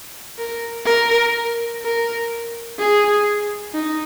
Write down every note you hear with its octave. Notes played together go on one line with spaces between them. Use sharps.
A#4
A#4
A#4
G#4
D#4